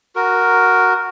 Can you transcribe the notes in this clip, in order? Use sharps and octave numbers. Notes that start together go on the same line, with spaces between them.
F#4 A#4